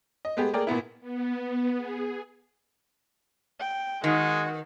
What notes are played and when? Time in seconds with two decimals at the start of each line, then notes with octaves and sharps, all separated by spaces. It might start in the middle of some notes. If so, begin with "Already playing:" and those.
0.25 D#5
0.37 G#3 A3 B3 G4 G#4
0.53 A3 A#3 G#4 A#4 D5 G5
0.67 A#2 A#3 B3 E4
1.01 B3
1.78 G#4
3.60 G5
4.04 D#3 G#3 F#4